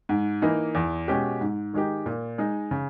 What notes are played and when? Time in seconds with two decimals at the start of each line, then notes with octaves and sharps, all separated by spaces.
0.09 G#2
0.42 E3 A#3 D#4
0.75 E2
1.08 B2 G#3 C#4 G4
1.41 G#2
1.73 D#3 G#3 D#4 G4
2.06 A#2
2.38 G#3 D#4
2.71 C#3